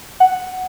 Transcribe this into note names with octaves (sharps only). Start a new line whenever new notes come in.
F#5